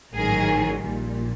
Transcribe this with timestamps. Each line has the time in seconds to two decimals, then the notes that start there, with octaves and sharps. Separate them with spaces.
0.15 A1 G#2 D#3 F#3 G#4 A#4
0.84 A#1 A#2 G3